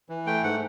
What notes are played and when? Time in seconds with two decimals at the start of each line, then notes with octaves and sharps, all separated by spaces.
0.09 E3
0.26 A3 G5
0.43 G#2 F#5